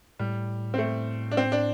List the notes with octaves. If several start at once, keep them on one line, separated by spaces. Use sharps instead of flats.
A2 G3
C4
A3
D4
C4
D4